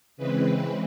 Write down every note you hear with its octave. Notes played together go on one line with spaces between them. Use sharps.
C#3 E3 G#3 C4 B4